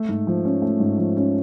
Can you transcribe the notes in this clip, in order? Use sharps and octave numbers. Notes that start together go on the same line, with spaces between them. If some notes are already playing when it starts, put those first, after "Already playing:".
Already playing: A3
G#2
F3
C#4
A3
G#2
F3
C#4